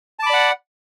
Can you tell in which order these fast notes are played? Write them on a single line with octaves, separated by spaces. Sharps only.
A5 D6 B5 D5 F#5